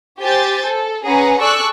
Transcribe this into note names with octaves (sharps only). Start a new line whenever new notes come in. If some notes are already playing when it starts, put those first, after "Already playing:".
G4 C5 G#5 G6 A6
A4
C#4 G#4 B4 F#5 G#5 A#5
G#4 A4 D5 C#6 E6 F#6